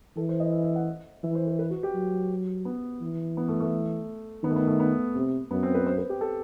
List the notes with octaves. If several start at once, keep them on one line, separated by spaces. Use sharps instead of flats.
E3 A4
C5
D#5
E5
E5
F#5
E3 E5
C5
B4
B4
F#4
G4
F#3
B3
E3
B3
A3
A3
D#3 B3
A3
B3
A3
B3
C3
F#2 B3
C4
B4
C5
B4
G4
A4